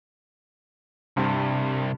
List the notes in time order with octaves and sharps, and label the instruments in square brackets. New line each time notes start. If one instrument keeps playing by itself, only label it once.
[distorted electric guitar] C2 [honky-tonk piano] G2 C4